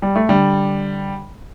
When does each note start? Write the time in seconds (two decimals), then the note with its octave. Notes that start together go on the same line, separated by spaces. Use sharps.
0.02 G3
0.16 A3
0.29 D3 G3